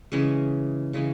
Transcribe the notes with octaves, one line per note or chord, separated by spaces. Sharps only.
C#3 E3 G#3 C#4
C#3 E3 G#3 C#4